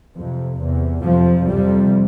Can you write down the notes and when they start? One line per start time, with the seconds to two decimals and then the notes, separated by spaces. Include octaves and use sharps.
0.14 F2 C3
0.59 E2 C3
1.02 F2 C3 F3
1.46 F2 C3 G3